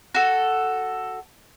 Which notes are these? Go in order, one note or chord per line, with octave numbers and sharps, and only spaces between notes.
F#4 A4